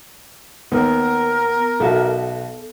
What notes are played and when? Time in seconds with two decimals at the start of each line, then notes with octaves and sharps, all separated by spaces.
0.72 D#2 B3 A#4
1.80 B1 F#4 A4 E5